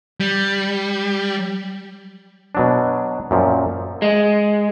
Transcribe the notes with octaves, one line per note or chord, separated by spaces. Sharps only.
G3
B2 F#3 D4
F#2 A#2 F3
G#3